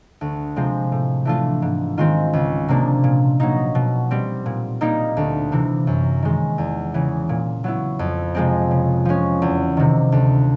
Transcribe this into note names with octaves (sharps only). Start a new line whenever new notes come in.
D2
C3 F3 G#3 C4
A2
E3 A3 D4 F4
G#2
D#3 G#3 C4 F4
C#2
C3 F3 A#3 D4
A#2
F#3 A#3 D#4
B2
G3 C4
A#2
G3 A#3 D#4
D2
C3 E3
F#2
D#3 G#3
E2
C#3 E3
A#2
F#3 B3 E4
F2
C3 F3 G#3 C4
C#3
F3 G#3 C#4
E2
C3 D#3
D2